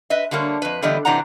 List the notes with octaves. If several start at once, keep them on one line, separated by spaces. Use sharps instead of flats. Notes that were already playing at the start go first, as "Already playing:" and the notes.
B4 D#5 E5
D3 G3 A#3 F#4 C#5
F2 B4
D3 E3 G3 B3 G4 D#5
C3 E3 D4 D#4 F#5 A#5